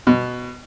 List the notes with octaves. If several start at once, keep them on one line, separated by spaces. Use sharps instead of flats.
B2